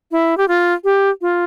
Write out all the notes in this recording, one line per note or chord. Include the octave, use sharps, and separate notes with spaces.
E4
G4
F4
G4
F4